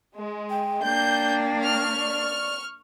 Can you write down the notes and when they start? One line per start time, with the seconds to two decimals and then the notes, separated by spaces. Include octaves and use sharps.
0.16 G#3
0.50 G5
0.83 A#3 D4 G6
1.62 C#6 F6
2.00 D5